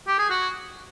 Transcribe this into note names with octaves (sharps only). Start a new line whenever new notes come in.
G4
G#4
F#4